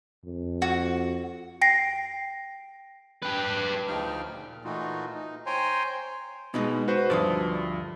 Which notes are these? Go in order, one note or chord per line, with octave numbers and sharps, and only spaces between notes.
F2
F#4
G5 A#6 C7
G4 B4
D2 C#3 F3 D#4 G5 F6
A#2
A#2 E3 A3 D#4 F4 F#4
D#4
C5 C#5 G5 G#5 A#5 C6
B2 G#3 B3 D#4 D#5
F#4 B4 C5
D2 G2 F3 D5 D#6